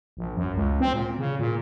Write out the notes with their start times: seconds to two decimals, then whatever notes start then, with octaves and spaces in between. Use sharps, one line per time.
0.17 A#1
0.37 F#2
0.55 C#2
0.80 C4
0.93 A#2
1.19 C#3
1.39 A#2